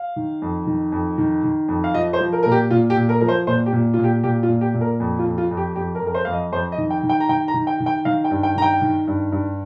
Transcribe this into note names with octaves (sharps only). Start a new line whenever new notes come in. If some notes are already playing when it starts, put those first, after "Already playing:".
Already playing: F5
D#3
F2
D#3
F2
D#3
D#3
F2
F5
F3 D#5
C5
F3
A#4
A#2 A#4
G4
A#2 F4
G4
A#2
A#4
F3 A#4
C5
A#2 C5
G4
A#2
A#2 F4
G4
A#2 G4
F4
A#2
G4
A#2
A#4
F2
F4
F2
F4
F2
G4
F2 G4
A#4
F2
A#4
C5
F2 F5
D#5
F2 C5
D#5
D#3
G5
D#3
G5
A#5
D#3 G5
A#5
D#3
G5
D#3
G5
D#3 F5
G5
G2
G5
D#3 A#5
G5
D#3
G2
G2